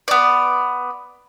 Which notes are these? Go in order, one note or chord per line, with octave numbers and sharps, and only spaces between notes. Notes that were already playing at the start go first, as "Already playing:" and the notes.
B3 D5